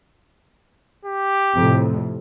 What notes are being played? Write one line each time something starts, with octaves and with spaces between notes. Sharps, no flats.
G4
F2 A2 C3